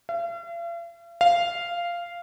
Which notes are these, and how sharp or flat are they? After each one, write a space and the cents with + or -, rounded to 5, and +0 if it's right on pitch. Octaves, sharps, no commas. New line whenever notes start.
F5 -45
F5 -10